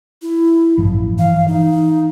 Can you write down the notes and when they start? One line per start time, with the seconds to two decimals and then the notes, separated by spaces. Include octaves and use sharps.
0.22 E4
0.77 A1 G2 F3
1.19 E3 F5
1.48 D#4